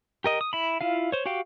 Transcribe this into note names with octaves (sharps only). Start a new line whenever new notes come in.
G4 A#4 D#5
D#6
E4 B5
E4 F4 F5
C5 C#5
F#4 G4 F5 G5